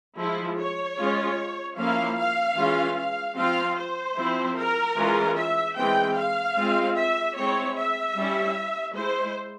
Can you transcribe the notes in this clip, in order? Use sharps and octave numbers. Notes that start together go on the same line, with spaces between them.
F3 G#3 E4
C#5
G#3 C#4 F4
F3 A#3 C#4 E4 F5
F5
E3 G#3 C#4 F4
F5
F3 C4 F4 F5
C5
F3 C4 E4
A#4
E3 G#3 C#4 F4
E5
E3 G#3 C4 G5
F5
G#3 C4 F4
E5
G#3 C4 E4 C#5
E5
G3 C#4 E4
G#3 E4 C5